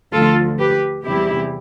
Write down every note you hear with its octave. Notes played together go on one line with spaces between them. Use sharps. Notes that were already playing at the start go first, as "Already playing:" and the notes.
D2 D3 F3 F4 A4
G4 B4
E2 C3 E3 G3 E4 G4